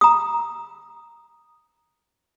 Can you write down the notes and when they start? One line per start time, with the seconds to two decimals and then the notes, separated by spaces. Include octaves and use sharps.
0.01 A#5 D#6